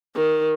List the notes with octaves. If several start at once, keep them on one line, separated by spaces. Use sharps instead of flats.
D#3